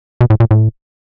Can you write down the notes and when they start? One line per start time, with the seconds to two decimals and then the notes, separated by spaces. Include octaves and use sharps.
0.21 B2
0.30 A2
0.40 A#2
0.51 A2